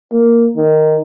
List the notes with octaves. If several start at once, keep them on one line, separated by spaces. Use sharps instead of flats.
A#3
D#3